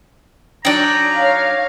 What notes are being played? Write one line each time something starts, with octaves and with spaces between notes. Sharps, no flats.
F#3 D4 D#4 D5 G5 A#5
C#5 F5